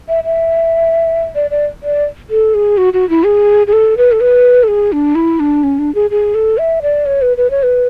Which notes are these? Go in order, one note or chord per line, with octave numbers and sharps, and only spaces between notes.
E5
E5
D5
D5
D5
A4
G#4
F#4
F#4
E4
G#4
G#4
A4
B4
A4
B4
A4
G#4
D4
E4
D4
C#4
D4
G#4
G#4
A4
E5
D5
C#5
B4
B4
C#5
B4